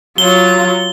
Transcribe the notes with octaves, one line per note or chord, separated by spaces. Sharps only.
F#3 F4 G7